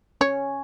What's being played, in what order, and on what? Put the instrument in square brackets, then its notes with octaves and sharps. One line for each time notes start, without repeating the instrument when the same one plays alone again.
[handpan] C#4 [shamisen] C#5